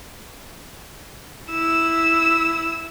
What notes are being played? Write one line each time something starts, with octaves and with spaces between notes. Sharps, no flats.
E4 E6